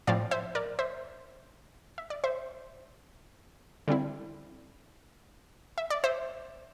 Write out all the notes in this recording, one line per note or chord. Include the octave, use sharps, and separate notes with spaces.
A2 F3 C4 D5 F5
C5 E5
A#4 D5
C5 E5
E5
D5
C5 E5
D3 G3 C4 E4
E5
D5
C5 E5